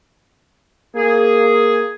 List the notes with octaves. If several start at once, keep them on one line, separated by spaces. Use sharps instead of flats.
A#3 G#4